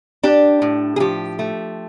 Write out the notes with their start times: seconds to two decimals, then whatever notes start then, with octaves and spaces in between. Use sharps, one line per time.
0.23 D4 G4
0.62 A2
0.96 G#4
1.00 F3 G4
1.39 A3